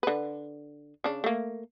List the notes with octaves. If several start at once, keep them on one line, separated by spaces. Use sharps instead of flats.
D3 B4
C#3 D4
A3 A#3